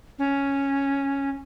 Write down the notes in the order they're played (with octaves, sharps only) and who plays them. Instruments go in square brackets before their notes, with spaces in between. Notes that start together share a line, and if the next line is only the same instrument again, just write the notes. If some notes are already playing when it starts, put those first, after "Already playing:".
[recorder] C#4